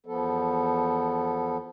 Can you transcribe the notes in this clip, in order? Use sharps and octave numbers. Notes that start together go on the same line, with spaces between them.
E2 F3 B3 A4